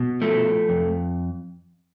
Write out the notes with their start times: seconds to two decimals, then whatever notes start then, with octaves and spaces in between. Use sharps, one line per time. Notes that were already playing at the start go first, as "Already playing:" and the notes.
Already playing: B2
0.21 F3 A3
0.69 F2